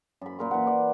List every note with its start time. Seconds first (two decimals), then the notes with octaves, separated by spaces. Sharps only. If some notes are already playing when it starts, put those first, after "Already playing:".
0.21 F#2 B5
0.39 A#2 A#4 C6
0.51 E3 F#5
0.67 D5